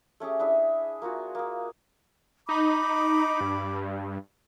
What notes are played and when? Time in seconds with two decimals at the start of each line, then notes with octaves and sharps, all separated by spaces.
0.20 A3 C#4 G4 G#4
0.39 D4 E4 G#4 E5
1.02 A#3 F4 F#4 G#4
1.35 A#3 G#4
2.49 D#4 B5 D6
3.41 G2